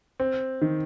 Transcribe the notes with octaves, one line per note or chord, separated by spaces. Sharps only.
C4
D#3